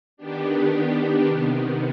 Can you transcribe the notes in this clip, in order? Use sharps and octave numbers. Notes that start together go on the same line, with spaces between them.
D#3 B3 D4 G4
C3 D#3 B3